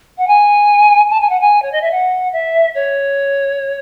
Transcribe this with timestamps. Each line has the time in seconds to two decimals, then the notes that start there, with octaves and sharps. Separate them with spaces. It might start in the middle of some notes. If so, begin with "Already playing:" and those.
0.17 F#5
0.27 G#5
1.10 A5
1.20 G#5
1.29 F#5
1.40 G#5
1.62 C#5
1.71 D#5
1.81 E5
1.91 F#5
2.32 E5
2.74 C#5